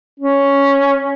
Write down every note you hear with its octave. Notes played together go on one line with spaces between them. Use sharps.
C#4